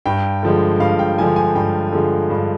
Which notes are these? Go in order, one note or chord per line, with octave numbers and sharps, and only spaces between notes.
G2 G5
D3 F3 G#3
G2 F5
G5
D3 F3 G#3 G#5
G#5
G2 G5
D3 F3 G#3
G2